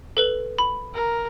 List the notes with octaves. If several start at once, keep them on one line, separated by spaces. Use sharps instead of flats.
A4 B4 F#7
B5
A#4